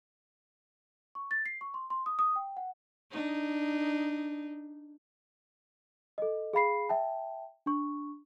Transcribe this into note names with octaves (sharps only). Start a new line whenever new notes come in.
C#6
A6
C7
C#6
C6
C6
D#6
D#6
G5
F#5
D4 D#4
A4 D#5
G#4 F5 B5 C7
E5 G5 A5
D4 C#6